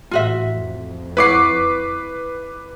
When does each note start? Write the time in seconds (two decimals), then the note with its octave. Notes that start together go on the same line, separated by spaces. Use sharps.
0.11 A1 F4 F#4 E5
0.53 F2
1.17 E4 B4 C#5 F#5 D6 C7